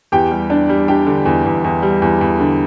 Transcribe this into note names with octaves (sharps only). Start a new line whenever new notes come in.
E2 G4 G5
G3
D4 D5
G3
D4 G4 G5
D3
E2
E2
E2
G3
E2
E2
D3